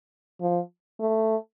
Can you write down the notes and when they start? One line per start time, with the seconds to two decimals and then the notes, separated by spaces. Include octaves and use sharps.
0.41 F3
1.00 A3